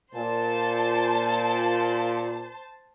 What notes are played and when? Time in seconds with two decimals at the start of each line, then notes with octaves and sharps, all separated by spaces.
0.14 A#2 C5 A5